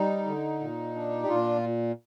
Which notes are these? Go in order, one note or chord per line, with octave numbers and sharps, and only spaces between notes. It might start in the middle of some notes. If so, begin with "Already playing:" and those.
Already playing: G3 D#4
D3
A#2
D4
G4
A#2 F4